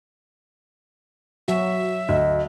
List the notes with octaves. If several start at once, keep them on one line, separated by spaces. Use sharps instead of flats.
F#3 F#4 E5
D2 D#5